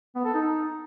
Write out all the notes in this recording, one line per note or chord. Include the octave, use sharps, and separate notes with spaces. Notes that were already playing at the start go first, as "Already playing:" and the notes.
B3
A4
D#4